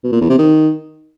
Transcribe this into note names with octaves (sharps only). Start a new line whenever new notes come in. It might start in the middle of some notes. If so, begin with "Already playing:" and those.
B2
A#2
E2
C3
D#3